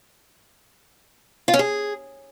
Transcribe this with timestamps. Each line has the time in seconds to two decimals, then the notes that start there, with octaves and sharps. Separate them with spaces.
1.48 F4
1.54 C#4
1.59 G#4